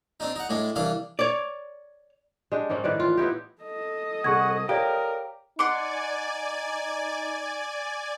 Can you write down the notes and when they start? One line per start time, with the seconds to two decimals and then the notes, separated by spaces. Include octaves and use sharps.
0.20 C4 D4 D#4
0.36 D#4 F#5
0.49 A2 G#3 D4
0.76 C2 E3 D4 F5
1.19 C#5 D5
2.52 G#3 D4 G4
2.70 G#2 G3 A#3 C#4
2.84 A2 D#3 B4 D5
3.00 E3 F4
3.17 B3 D#4 E4 G4
3.62 A4 D#5
4.24 C2 G#4 F#5 C#6 G#6
4.69 G4 A#4 C#5 D5 F5
5.59 D#4 D5 F#5 G#5 C6 D6